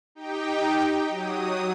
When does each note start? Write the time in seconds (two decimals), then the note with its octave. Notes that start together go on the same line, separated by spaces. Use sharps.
0.15 D#4 G4 G5
1.08 F#3 D#6